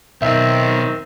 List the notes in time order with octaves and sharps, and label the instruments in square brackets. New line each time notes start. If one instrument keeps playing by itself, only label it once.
[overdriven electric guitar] B1 [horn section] D#3 C4 [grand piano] E5